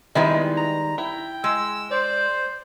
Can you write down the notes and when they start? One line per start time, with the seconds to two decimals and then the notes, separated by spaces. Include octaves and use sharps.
0.15 D#3 G3 G#3 B3 E4 E5
0.57 A#5
0.98 E4 G5
1.44 G#3 E6
1.91 C5 D5